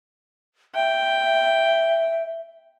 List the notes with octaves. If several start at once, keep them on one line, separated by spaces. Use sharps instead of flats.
E5 G5